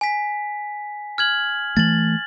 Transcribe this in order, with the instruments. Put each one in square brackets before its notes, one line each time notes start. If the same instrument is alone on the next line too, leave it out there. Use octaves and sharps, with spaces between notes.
[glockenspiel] G#5 B6
F6 G#6 F#7
[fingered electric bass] E3 A3 [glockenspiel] A6 F#7